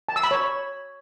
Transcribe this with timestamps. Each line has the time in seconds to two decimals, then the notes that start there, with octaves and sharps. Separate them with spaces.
0.09 A5
0.16 E6
0.23 B5
0.31 C#5